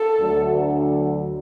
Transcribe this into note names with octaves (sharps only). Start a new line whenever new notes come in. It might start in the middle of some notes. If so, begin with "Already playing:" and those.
Already playing: A4
D2 D3 F#3